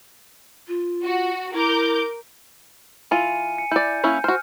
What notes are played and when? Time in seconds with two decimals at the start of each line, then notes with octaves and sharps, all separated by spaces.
0.68 F4
1.04 F#4
1.53 E4 A#4 D6 G6
3.11 E3 F4 G#5 C#7 D#7
3.58 C#7
3.71 E4 D5 G6
4.04 A#3 C#4 E4 G6
4.24 F#4 C5 F6